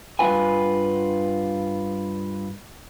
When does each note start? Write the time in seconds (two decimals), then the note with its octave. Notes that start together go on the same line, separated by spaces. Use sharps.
0.19 G2 A#2 F4 B4 G#5